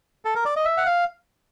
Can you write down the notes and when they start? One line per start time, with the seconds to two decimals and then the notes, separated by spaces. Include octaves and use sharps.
0.25 A4
0.35 A#4
0.45 D5
0.56 D#5
0.65 E5
0.77 F#5
0.86 F5